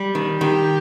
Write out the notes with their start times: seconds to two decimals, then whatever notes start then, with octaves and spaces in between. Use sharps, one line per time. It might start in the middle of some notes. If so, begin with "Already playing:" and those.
Already playing: G3
0.15 D#3
0.41 D#3 G4